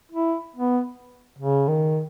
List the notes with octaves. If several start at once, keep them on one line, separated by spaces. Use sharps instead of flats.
E4
B3
C#3
D#3